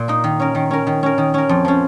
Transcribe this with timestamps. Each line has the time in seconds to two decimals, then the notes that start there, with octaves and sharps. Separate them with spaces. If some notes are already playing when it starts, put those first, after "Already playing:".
Already playing: A#2
0.08 A#3 D#4
0.24 D#3
0.40 C#4 A#4
0.55 D#3
0.71 C#4 A#4
0.87 D#3
1.03 C#4 A#4
1.18 D#3
1.34 C#4 A#4
1.49 F2
1.65 F3 C#4